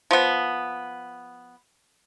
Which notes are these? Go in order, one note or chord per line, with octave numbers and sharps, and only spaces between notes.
F3 B3